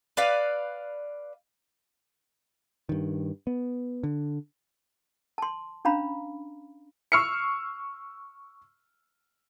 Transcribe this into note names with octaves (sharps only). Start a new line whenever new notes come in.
B4 D5 F5
G2 D#3
B3
D3
A5 C6
C#4 D4 F5 A#5 B5
C#6 E6 F6 C7 C#7